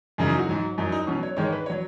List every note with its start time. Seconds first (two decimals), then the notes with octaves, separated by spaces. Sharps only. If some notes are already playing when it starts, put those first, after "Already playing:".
0.18 F#2 C#3 F#3 D#4
0.29 D#4
0.39 F#4
0.49 G#2 F#3
0.78 F#2 F#3 D#4
0.92 D#4
1.07 B2 F#3 C#4
1.23 C#5
1.37 G#2 D#3 G#3 C#5
1.53 B4
1.66 C#5
1.70 F#3